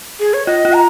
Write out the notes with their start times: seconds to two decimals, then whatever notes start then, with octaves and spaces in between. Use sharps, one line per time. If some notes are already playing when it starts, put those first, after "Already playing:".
0.20 G#4
0.34 C#5
0.47 F4 D#5
0.65 F4
0.73 A#5